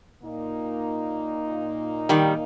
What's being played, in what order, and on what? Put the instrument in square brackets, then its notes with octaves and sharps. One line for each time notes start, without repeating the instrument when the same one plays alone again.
[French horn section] A#2 A#3 D#4
[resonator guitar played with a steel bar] D#3 G3